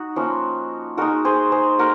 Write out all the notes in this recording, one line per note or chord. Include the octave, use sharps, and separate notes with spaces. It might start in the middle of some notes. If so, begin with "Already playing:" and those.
Already playing: D#4 F#4
F3 A#3 C#4
G#3 D#4 F#4 A#4
G#4 C5
G#4 C5
A#3 F#4 A#4